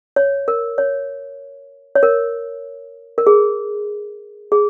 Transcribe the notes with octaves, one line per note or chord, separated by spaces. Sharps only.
C#5
A#4
C#5
C#5
A#4
A#4
G#4
G#4